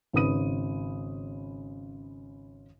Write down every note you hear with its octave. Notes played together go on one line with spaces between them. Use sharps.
G#1 C#3 B4 D#6 D#7